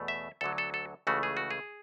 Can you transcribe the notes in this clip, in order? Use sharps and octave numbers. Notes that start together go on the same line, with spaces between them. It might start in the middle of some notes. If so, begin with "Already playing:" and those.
Already playing: E2 B2 A3
E5
D2 D3 F#3 A4
A4
A4
C#2 C#3 E3 A3 F#4
G#4
F#4
G#4